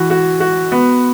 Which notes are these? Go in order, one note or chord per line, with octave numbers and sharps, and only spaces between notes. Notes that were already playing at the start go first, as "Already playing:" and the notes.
Already playing: E3 F#4
F#4
F#4
B3